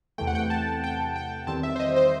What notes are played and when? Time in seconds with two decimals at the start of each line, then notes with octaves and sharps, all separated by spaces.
0.18 E2 C3 E3 A3 G5
0.27 F#5
0.35 G5
0.50 A5
0.84 G5
1.16 G5
1.47 E2 D#3 G3 C4 A5
1.63 E5
1.76 C5
1.80 D#5
1.96 C5